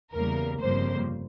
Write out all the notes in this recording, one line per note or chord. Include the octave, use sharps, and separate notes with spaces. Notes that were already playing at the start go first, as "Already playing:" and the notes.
E2 C#3 G3 A#3 A#4
G1 F2 C#3 G3 A#3 C5